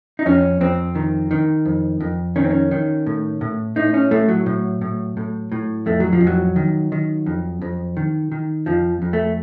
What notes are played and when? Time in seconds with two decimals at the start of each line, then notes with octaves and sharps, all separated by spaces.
0.19 D#4
0.26 F2 C#4
0.61 F2 C4
0.95 D#3
1.31 D#3
1.65 F2
2.01 F2
2.36 D#3 C#4
2.44 C4
2.51 C#4
2.71 D#3
3.06 A2
3.41 A2
3.76 A2 D#4
3.94 C#4
4.11 A2 A3
4.28 F#3
4.46 A2
4.81 A2
5.17 A2
5.52 A2
5.86 F2 A3
6.00 F#3
6.13 F3
6.21 F2
6.27 F#3
6.56 D#3
6.92 D#3
7.26 F2
7.62 F2
7.97 D#3
8.32 D#3
8.66 F2 F3
9.02 F2
9.13 A3